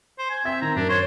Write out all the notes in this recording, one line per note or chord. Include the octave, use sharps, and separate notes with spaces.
C5
G#5
C4 E5 G#6
D#3 A#5
F#2 D4
C5 C#5